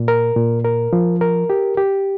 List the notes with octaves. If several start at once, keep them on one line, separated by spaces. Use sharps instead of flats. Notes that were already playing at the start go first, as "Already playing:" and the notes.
Already playing: A#2
A#4
A#2
A#4
F3
A#4
G4
G4